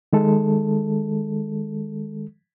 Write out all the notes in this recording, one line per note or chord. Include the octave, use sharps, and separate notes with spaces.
D#3 G#3 A4